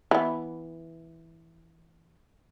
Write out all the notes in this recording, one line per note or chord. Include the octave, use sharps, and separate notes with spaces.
E3 B3